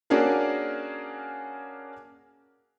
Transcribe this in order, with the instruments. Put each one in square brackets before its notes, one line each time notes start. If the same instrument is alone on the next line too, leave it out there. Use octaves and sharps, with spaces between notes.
[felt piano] A#3 C#4 D4 F#4 G#4 A#4